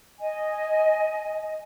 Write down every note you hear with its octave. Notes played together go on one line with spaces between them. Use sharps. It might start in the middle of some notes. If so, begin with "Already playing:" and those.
D#5 G#5